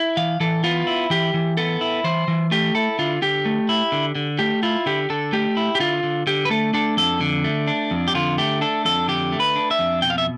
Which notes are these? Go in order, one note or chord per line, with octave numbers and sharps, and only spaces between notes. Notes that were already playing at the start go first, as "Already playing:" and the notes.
Already playing: E4
E3 F5
E3 A4
B3 F4
E4
E3 G4
E3
B3 A4
E4
E3 C5
E3
A3 G4
E4 A4
D3 F4
D3 G4
A3
E4
D3
D3
A3 G4
E4 F4
D3 G4
D3 A4
A3 G4
E4
G4
D3 F4
D3
D3 G4
B4
A3 A4
D4 A4
F2 A4
D3
A3
D4
F2
G4
D3 F4
A3 G4
D4 A4
F2 A4
D3 G4
A3
B4
D4
E5
F2
B2 G5
F5
E5